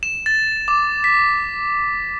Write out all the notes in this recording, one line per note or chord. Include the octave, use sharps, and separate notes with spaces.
E7
A6
D6
B6